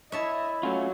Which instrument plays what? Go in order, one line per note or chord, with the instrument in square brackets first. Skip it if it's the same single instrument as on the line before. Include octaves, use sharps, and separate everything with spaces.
[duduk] E4 [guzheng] C#5 E5 A5 [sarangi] D#5
[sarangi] F#3 [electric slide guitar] A3 C#4 F4